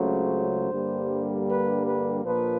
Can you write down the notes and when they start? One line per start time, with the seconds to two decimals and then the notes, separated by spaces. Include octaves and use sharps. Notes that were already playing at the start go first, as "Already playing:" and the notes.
Already playing: C#2 C#3 F#3 A3 C4 C5
0.70 G2 D3 G3 A#3
1.48 B4
1.85 B4
2.24 A#1 A#2 F3 A#3 B4